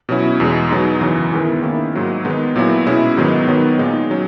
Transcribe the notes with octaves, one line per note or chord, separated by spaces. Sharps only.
B2 F#3 C#4 E4
E2 B2 G#3
B2 F#3 B3 D#4
F#2 C#3 E3
D#3 G#3 B3 E4
D#3 A#3 C#4 E4
G#2 F#3 A#3
D#3 G#3 B3 D#4
A#2 F#3 B3 E4
B2 G#3 C#4 E4
G#2 D#3 F#3 B3 D#4
D#3 F#3 B3
A#2 G#3 D#4
F#3 C#4